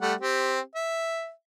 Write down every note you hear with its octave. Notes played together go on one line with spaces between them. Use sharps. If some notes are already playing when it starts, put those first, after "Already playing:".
G3 A3 F#5
C4 G4
E5